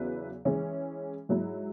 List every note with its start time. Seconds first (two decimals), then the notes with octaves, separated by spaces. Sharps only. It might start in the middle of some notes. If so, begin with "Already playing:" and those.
Already playing: E2 C#3 F#3 E4 B4
0.45 E3 G#3 C#4
1.29 G#2 F#3 E4